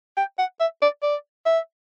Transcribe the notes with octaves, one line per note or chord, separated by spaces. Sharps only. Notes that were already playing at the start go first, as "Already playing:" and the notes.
G5
F#5
E5
D5
D5
E5